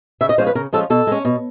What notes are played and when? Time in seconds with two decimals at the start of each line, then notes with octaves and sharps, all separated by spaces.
0.21 C#3 E5
0.29 D#5
0.38 F3 G#3 C#4 F4 C5
0.47 B4
0.55 C#3 A#4
0.73 F3 G#3 C#4 F4 A4
0.90 B2 A4
1.07 G#3 C#4
1.25 B2